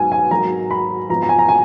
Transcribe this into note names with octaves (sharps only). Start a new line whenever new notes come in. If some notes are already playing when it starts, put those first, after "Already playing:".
Already playing: G#2 F#3 B3 D#4 G#5
G#5
G#1 G#2 F#3 A#3 D#4 A#5
B5
G#1 G#2 F3 B3 A#5
A#5
G#5
A#5
G#5